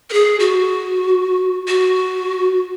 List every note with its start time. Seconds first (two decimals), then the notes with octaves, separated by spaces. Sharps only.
0.10 A#4
0.13 G#4
0.40 F#4
1.67 F#4